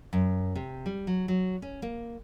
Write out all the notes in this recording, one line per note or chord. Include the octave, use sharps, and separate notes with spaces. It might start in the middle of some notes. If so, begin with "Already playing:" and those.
F#2
C3
G3
F#3
F#3
C#4
A#3